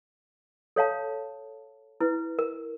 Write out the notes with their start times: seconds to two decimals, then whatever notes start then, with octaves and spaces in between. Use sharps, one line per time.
0.76 A4 C#5 F5 A5
2.01 E4 B4
2.39 A#4